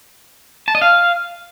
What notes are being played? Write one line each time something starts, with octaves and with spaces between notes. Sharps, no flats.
A5
D#5
F5